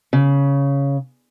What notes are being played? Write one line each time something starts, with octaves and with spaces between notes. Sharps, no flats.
C#3